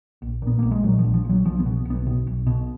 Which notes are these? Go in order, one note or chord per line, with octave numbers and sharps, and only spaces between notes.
A#1
A#2 B3
A#1 A#3
G#3
A#2 F#3
F3
A#1
F3
A#1
F#3
B1 F3
B3
B2
B1 B3
B2
B1
B2